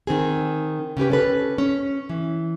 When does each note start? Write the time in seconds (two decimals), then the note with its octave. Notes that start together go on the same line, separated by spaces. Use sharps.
0.07 D#3 C4 G#4
0.97 C#3 C#4 G4 B4
1.10 C#4 A4 B4
1.58 C#4
2.10 E3